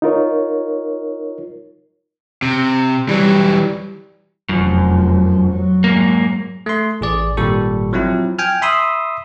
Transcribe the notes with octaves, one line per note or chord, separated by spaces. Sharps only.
D#4 F4 A#4 C#5
C3
E3 F#3 G3
F1 F#2 F3
F#3
G#2 A#3
A3 C6
A1 G#4 D5
G#1 A#2 G3 A4 C#6
F3 F#3 C4 E4
G5 G#5 F6
E5 B5 C6 D#6 E6